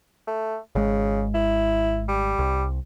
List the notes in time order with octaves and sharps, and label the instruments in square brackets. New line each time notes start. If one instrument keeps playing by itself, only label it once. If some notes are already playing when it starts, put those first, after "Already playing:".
[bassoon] A3
[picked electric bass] G#1 G#3 [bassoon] C#3
[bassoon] E4
G3
[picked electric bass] C2